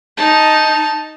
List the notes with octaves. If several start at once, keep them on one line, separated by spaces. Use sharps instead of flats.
D#4 A5